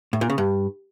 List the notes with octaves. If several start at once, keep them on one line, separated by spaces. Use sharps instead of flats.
A2
A#2
C#3
G2